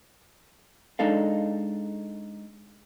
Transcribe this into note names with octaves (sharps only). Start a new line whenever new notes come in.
G#3 D4 D#4 A4 F5